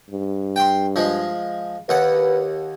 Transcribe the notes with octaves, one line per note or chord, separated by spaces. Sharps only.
G2
G5 C6
F3 G#3
D#2 B4 F#5